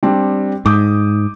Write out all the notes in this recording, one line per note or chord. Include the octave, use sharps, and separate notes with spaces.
G3 C4 D4
G#2 D6 D#6 G6